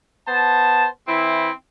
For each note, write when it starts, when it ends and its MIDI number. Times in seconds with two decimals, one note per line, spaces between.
0.27 0.86 59
0.27 0.86 72
0.27 0.86 81
1.07 1.49 52
1.07 1.49 60
1.07 1.49 64